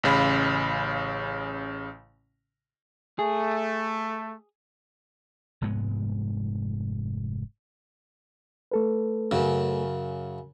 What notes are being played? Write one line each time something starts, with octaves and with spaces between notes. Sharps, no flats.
A1 C#3 F5 B5
A3 G#4
F1 G#2 G#3 B3
A3 A4 B4
F#2 C#3